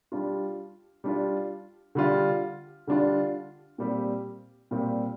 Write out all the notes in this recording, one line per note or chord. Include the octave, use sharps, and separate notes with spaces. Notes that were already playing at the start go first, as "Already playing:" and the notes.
G3 D4 F4
G3 D4 F4
D3 G3 D4 F4
D3 G3 D4 F4
A#2 G3 C4 G4
A#2 G3 C4 G4